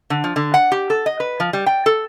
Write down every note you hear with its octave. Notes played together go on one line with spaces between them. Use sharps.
D3
F3
D3
F#5
G4
A4
D#5
B4
F3
G3
G5
A4